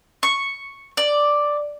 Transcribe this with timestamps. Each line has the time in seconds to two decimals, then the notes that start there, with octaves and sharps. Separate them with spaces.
0.23 C#6
0.97 D5